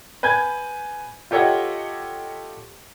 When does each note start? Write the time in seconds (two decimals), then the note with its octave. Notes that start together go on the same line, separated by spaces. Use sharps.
0.23 B4 G#5 G6 G#6
1.31 F4 G4 A4 C#5 D#5 F#5